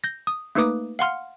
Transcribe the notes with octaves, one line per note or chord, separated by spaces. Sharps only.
G6 A#6
D#6
A3 A#3 D#4 B4 D6 D#6
F5 F#5 C6 F6